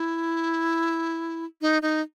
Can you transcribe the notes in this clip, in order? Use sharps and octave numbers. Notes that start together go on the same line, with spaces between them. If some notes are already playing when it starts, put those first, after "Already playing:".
Already playing: E4
D#4
D#4